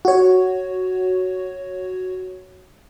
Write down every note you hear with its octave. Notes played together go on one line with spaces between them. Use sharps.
F#4 C#5